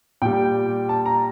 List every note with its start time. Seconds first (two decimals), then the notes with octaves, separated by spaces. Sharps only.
0.22 A#2 G3 G5
0.89 A5
1.06 A#5